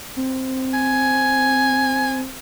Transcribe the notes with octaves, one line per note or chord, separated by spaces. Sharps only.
C4
G#5